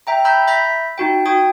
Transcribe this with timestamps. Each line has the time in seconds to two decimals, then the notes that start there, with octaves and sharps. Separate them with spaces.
0.07 E5 G5 A#5
0.25 A#5 B5 E6 G6
0.47 E5 B5 G6 A#6 B6
0.98 D#4 F#4 G5
1.26 F#4 G5 D#6 G#6